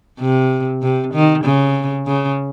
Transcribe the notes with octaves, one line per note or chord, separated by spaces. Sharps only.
C3
C3
D#3
C#3
C#3